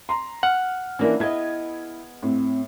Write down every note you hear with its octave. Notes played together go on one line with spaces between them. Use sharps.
A#5 C6
F#5 F6
E3 A#3 C#4 D4 E4
B3 E4 G#4 D#5 G#6
A2 C4